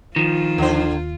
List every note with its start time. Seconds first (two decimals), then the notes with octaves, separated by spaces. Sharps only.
0.16 D#3 F3 F4
0.58 D#2 D3 C5